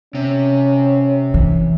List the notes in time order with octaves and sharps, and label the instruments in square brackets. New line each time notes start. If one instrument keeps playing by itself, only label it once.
[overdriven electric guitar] C3 [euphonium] C#4
[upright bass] E3